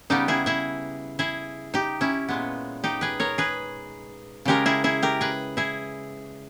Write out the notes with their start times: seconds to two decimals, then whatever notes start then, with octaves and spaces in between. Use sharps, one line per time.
0.10 C#3 G3 B3 D#4 G4
0.28 E4 G#4
0.46 E4 G#4
1.19 E4 G#4
1.74 D#4 G4
2.01 C#4 E4
2.28 A#2 G#3 B3
2.84 D#4 G4
3.01 G#4 B4
3.20 A#4 C#5
3.38 G#4 B4
4.45 C#3 G#3 C#4 G4 A#4
4.66 E4 G#4
4.84 E4 G#4
5.03 G4 A#4
5.21 G#4 B4
5.57 E4 G#4